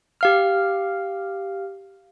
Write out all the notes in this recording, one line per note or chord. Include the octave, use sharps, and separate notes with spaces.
G4 F5 F6